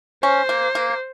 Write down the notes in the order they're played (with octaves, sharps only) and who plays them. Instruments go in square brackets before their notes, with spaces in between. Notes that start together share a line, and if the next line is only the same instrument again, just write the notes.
[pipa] C#4 [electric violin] C5
[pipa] A#3
A#3